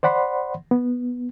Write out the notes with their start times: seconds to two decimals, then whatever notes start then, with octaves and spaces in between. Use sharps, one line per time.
0.03 C5 D5 F#5 B5 C6
0.71 B3